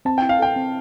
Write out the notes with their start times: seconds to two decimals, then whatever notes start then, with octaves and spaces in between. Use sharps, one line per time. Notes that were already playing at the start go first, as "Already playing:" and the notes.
0.05 C4 A5
0.18 E4 G5
0.29 F5
0.39 A4 G5
0.56 C4